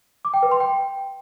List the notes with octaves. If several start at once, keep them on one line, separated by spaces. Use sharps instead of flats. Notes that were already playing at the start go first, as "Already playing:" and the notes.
D6
G5
B4
C6
G5